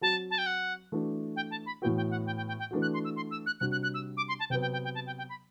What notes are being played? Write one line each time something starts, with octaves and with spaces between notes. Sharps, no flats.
F#3 C4 F#4 A5
A5
G5
F#5
E3 A3 D4 F#4
G5
A5
B5
A2 E3 B3 F#4 G5
G5
F#5
G5
G5
G5
G5
E3 A3 D4 F#4
F#6
C6
E6
C6
E6
F#6
C3 G3 D4 F#4 F#6
F#6
F#6
E6
D6
C6
A5
C3 F#3 B3 G5
G5
G5
G5
A5
G5
G5
B5